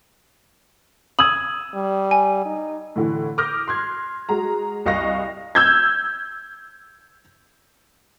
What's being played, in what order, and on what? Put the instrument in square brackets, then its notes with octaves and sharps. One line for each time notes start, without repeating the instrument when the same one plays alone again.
[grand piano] D#6 E6 G#6 [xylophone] F#7
[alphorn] G3
[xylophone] G#5
[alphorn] D#4
[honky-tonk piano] A2 D3 E3
D6 D#6 F6 G6 A#6
C6 F#6 G#6
G#3 F#4 A#5
C2 D#5 F5 C#6 F#6 A#6
E6 G6 G#6